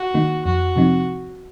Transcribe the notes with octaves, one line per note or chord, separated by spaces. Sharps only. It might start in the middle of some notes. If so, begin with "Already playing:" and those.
Already playing: F#4
D#3 A#3 D#4
F2 F#4
C3 F3 C4 D#4